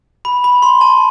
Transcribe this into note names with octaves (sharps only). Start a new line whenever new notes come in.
B5
B5
C6
A5